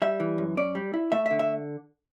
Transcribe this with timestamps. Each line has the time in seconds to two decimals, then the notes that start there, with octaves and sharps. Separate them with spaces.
0.02 G3 E5
0.20 E3
0.38 F#2
0.57 C#4 D5
0.75 G3
0.94 E4
1.12 A3 E5
1.26 E5
1.31 D3
1.39 E5